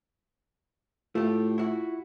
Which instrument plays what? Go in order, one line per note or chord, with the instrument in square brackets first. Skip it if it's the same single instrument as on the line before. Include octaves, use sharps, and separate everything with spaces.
[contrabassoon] A2 [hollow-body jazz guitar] A3 G4 [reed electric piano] F4
[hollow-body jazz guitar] E4 F#4